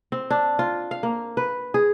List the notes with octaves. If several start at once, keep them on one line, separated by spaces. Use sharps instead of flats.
C4
D4
F4
F5
A#3
B4
G#4